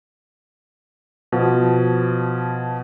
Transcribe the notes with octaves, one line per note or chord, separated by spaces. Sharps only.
B2 F3